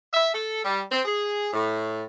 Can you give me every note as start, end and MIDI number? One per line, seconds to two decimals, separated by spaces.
0.13 0.31 76
0.34 0.60 69
0.65 0.81 55
0.92 1.01 60
1.05 1.49 68
1.53 2.03 45